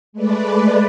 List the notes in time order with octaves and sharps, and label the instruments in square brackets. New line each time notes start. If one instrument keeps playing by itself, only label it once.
[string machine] G#3 A3 B4 D5